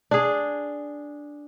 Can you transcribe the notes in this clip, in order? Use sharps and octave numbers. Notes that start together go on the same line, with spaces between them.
D4 G#4